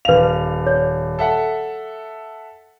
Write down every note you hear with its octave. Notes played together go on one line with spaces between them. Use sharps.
D#1 B4 F5 F7
C#5
A4 E5 F#5